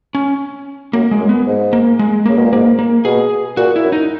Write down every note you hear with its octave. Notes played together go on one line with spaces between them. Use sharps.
C#4
F#2 A#3
G#3
F#2
B3
G#2
A#3
G#3
C#3 A#3
B2
A#2
G#2 A#3
A#3
B2 G#4
A#2 F#4
E4
F#2
D#4